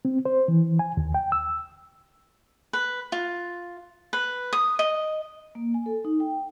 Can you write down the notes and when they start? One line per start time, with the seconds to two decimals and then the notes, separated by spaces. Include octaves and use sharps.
0.05 C4
0.25 C5
0.48 E3
0.79 G#5
0.97 D#2
1.14 G5
1.32 E6
2.73 B4
3.12 F4
4.13 B4
4.53 D#6
4.79 D#5
5.55 A#3
5.74 G#5
5.86 A4
6.05 D#4
6.20 G5